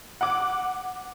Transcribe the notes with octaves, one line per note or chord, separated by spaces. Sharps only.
F#5 D6